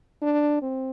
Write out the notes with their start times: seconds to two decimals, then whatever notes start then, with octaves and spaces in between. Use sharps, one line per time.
0.22 D4
0.62 C4